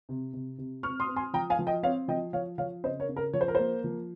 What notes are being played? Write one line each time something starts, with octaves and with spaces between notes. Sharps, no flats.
C3
C3
C3
C4 C#6 F6
C6 D#6
C4
G#5 C6
F3 G5 A#5
F5 G#5
F3
D#5 G5
C4 C#5 F5
F3 D#5 G5
F3 C#5 F5
F3 C#5 F5
C#3 C5 D#5
A#4 C#5
C#3
A#4
F3 C#5
C5
A#4
A#3 C5
F3